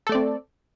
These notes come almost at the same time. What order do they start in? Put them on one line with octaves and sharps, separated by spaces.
A4 A3 D5 C4